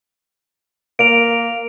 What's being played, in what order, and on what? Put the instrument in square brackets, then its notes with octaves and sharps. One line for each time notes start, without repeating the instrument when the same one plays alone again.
[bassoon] A#3 [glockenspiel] D7 F7